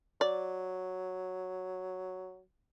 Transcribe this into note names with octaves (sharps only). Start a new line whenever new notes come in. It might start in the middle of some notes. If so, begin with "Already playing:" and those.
F#3 D5